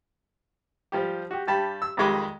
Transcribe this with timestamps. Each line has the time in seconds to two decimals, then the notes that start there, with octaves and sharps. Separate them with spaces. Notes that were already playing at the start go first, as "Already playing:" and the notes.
0.92 F3 G3 G4
1.31 F#4 G4
1.47 G2 G3 G4 A5 B5
1.82 E6
1.97 F2 D#3 G3 G#3 B5 D6